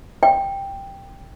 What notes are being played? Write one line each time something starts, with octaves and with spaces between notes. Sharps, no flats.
G5